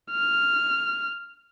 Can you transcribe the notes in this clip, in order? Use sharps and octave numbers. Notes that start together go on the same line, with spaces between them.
F6